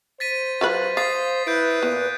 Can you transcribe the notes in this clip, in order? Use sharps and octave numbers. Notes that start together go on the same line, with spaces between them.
C5 A6 B6 D#7
F#3 F4 B4
F5 D#6 A6 C7
E4 B4 G6 D7
A#2 B3